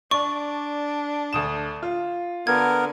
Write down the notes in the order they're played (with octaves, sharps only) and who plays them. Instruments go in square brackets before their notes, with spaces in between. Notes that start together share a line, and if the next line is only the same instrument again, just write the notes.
[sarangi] D4 [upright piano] D5 [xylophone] C#6
[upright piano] D2 D#6 E7
F4
[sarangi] D3 [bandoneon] B3 A#4 [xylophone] G#6